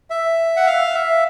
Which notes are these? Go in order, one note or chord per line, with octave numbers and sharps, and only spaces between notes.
E5
F#5
F5
E5